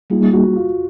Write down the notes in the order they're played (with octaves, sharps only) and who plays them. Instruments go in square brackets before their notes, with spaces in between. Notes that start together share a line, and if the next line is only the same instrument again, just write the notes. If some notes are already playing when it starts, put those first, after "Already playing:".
[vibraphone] G3 A#3 D#4 G#4 [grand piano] F4
[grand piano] F#4
F4